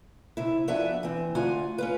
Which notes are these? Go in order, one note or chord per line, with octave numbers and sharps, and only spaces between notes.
C3 E4
F3 B3 D4 F#4 E5 G#5
E3 C4
D2 F4 F#4 G#5
C#4 F4 B4